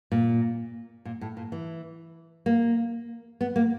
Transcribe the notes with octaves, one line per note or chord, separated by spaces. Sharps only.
A#2
A#2
A2
A#2
E3
A#3
B3
A#3